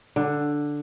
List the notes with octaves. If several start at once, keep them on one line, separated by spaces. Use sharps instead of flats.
D3